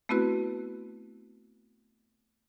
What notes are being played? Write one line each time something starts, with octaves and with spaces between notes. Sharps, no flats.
A3 B3 C4 E4 F#4 B4